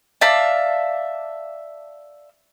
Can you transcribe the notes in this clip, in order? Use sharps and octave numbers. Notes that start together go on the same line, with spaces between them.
D5 E5 F5 A5